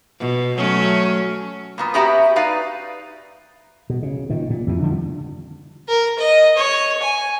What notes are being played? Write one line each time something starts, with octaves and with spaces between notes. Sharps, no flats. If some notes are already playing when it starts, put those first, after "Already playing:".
B2
F#3 A3 C#4
A#2 A#3 B3
B3 C#4 F#4 G4 E5 A#5
D#4 B4 D5 F5
B2
C#3
A#2 D#3
A#2
F2 C3 E3
D3 D#3 F3 G3
A#4
D#5
C#5
G#5